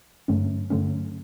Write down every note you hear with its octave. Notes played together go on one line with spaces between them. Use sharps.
G2 D3 F#3 A3 C#4
G2 D3 F#3 A3 C#4